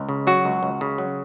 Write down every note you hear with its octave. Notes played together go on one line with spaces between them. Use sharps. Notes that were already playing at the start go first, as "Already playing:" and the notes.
Already playing: C#2
C#3
F#3 F#4
C#2
C#2
C#3
F#3